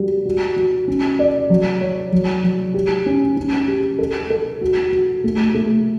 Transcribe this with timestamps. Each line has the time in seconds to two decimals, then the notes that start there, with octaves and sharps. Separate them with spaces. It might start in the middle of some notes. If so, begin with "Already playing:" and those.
Already playing: G3 F#4
0.26 F#4
0.56 F#4
0.88 C#4
1.19 D5
1.50 F#3
1.81 C#5
2.12 F#3
2.44 F#3
2.74 G4
3.06 C#4
3.37 C#4
3.68 G4
3.99 A4
4.30 A4
4.61 F#4
4.93 F#4
5.24 A3
5.55 A3